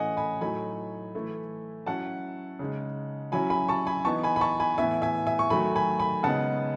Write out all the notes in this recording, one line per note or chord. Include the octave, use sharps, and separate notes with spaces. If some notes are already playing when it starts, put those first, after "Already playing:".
Already playing: A2 E3 A3 C#4 D#5 F#5 G#5
G#5 B5
A2 F#3 A3 D#4 G#5 B5
E3 A3 E4
F#3 C#4 E4 F#5 A5
C#3 G#3 D#4
F#3 C#4 E4 G#5 B5
G#5 B5
A5 C#6
G#5 B5
E3 B3 D#4 A5 C#6
G#5 B5
B5
A5 C#6
G#5 B5
A2 E3 B3 E4 E5 G#5
E5 G#5
E5 G#5
C#6
D#3 F#3 A3 G#5 B5
G#5 B5
G#5 B5
C#3 G#3 B3 D#4 F#5 A5